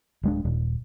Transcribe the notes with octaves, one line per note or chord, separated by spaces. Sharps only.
D1 G#3 D4
D#1